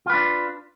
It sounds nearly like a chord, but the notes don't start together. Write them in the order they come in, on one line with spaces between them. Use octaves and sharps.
F4 B4 D4